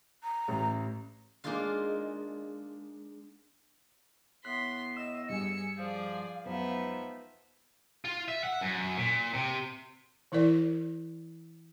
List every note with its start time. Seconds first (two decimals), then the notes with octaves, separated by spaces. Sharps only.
0.24 A#5
0.48 A1
1.44 G#3 A#3 D4 D#4 F4 F5
4.45 A2 B3 C6 F#6 B6
4.97 D#5 E6 E7
5.30 G2 G3 G#4 G#5 E6 C#7
5.77 F3 G#4 D5 F5
6.46 F#2 F3 G#3 B3 D#4 E5
8.05 F4
8.28 E5
8.44 F#5
8.61 F#2
8.97 A#2
9.34 C3
10.32 E3 E4 A#4 D5